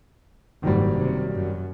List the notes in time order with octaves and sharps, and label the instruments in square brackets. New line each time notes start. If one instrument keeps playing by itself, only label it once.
[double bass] F#1 G#2 [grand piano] D#3 F#3 G3
[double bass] C3
F#2